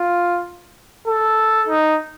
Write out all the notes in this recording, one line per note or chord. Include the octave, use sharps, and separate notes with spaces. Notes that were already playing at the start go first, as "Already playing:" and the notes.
Already playing: F4
A4
D#4